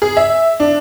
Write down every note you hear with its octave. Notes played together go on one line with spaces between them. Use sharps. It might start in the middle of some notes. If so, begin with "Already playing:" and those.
G#4
E5
D4